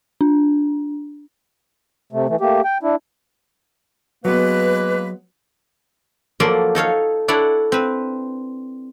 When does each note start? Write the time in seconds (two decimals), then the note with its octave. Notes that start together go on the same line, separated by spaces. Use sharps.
0.21 D4
2.13 C3 A3
2.29 E3 A3
2.41 A3 A#3 G4
2.64 G5
2.83 D4 E4
4.25 F#3 G#3 A#3 B3 B4
6.40 F3 F#3 A#3 A4 D5 C6
6.75 D#4 A4 C#5 F5
7.28 D4 E4 A4 C#5 D5 F#5
7.72 C4 B4